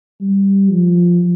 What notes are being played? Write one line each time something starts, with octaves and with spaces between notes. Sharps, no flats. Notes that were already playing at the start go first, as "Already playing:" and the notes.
G3
F3